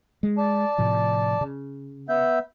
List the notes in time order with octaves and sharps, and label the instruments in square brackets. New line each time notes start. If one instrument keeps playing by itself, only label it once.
[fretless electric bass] G#3
[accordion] D5 A5
[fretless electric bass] A2 C3 F3
C#3
[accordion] B3 E5 G6